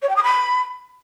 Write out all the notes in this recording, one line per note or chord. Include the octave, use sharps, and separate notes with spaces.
C#5
G5
D#6
B5